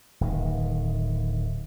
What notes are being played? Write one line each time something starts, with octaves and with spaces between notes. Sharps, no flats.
D1 D#3